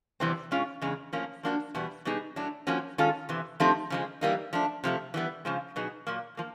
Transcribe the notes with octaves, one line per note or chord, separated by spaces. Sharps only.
E2 C3 E3 G3 C4
B2 G#3 C#4 F4
E2 C#3 G#3
A2 F3 A#3 C#4
F3 A#3 D4 F#4
E2 B2 G3 B3
B2 G3 B3 D#4 G#4
A2 F#3 A3 D4
F3 A#3 C#4 F#4
D#3 G#3 C#4 F4 A4
E2 C3 E3
F3 A3 C4 D#4 G4
C#3 F3 G#3
E3 G3 A#3 D#4
F3 A3 D4
C3 F3 A3
E3 G3 B3
C#3 F3 G#3
B2 F#3 B3 D#4 G#4
A#2 F#3 A#3
F3 A#3